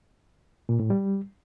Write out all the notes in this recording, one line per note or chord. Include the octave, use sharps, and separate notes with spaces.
A#2
A2
G3